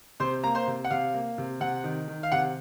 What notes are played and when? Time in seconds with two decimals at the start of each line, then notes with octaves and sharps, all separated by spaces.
0.20 C3 C5 C6
0.44 A#3 A#5
0.55 C5 C6
0.67 C3
0.85 F#5
0.91 C3 F5
1.14 A#3
1.38 C3
1.60 C3 F#5
1.84 D#3
2.08 D#3
2.23 F5
2.32 C3 F#5